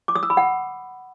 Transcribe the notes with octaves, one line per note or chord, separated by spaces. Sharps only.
D6
D#6
E6
B5
F#5